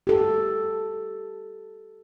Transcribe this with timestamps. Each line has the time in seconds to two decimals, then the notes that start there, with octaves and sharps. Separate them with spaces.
0.07 G4 A4